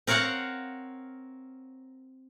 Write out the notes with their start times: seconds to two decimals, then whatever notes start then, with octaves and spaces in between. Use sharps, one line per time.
0.07 C4 A#4 C#5 F5 F#5